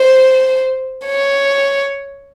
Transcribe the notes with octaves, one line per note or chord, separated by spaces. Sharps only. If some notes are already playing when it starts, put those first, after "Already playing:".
Already playing: C5
C#5